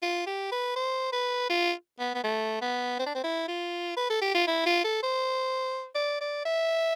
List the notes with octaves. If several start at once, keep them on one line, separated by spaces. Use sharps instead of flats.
F4
G4
B4
C5
B4
F4
B3
B3
A3
B3
C4
D4
C4
E4
F4
B4
A4
G4
F4
E4
F4
A4
C5
D5
D5
E5